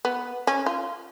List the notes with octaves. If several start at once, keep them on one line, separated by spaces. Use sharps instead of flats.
B3
C#4
F4